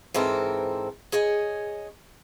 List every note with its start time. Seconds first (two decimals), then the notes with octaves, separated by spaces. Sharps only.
0.14 G#2 E3 C4 A4 A#4
1.12 G#4 C#5 D#5 G#5